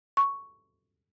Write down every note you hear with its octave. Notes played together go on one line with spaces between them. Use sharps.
C#6